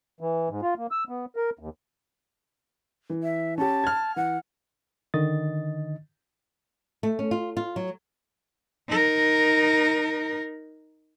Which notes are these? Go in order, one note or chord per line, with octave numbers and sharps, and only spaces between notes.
E3
G#2
F4
A#3
E6
B3
A#4
D#2
E3
E5
C#4 G4 A5
F6 G#6
E3 F#5
D3 D#3 D#5 A6
A3
C#4
F4
F4
F#3
D#4 A#4